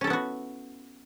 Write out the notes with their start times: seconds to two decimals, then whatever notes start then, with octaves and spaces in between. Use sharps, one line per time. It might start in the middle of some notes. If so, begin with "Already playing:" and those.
0.01 C#4
0.04 A4
0.07 E4
0.10 B3
0.13 F#4